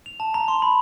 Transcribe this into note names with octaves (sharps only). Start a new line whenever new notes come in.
F7
A5
A#5
C6
B5